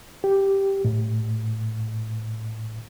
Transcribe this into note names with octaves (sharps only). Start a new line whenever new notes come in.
G4
A2